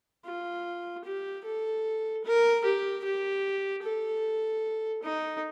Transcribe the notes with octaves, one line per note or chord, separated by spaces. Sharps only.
F4
G4
A4
A#4
G4
G4
A4
D#4